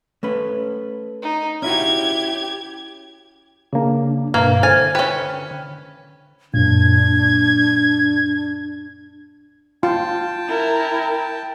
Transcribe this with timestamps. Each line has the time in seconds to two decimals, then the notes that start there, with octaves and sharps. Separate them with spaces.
0.23 A3 C#4 B4
1.22 D#4
1.62 C#4 E4 F#4 G4 G#6
3.73 C#3 A#3 D4
4.34 G2 B2 A#3 D4 B4 F5
4.63 D3 C5 G#5 F6
4.95 C#4 B4 G5
6.54 F#2 A#2 D4 G#6
9.83 F4 G5 A5
10.47 E4 A#4